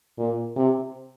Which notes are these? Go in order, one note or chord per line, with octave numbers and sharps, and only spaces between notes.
A#2
C3